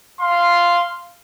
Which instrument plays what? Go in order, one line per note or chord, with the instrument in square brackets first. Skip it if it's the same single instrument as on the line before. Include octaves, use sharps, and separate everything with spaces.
[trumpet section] F5 C6